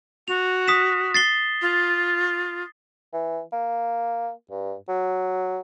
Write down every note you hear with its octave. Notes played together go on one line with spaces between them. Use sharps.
F#4 F7
D#6 B6 E7
A6 C7 G7
F4
E3
A#3
G2
F#3